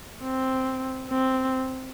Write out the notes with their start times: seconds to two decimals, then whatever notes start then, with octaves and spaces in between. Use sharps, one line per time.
0.23 C4
1.09 C4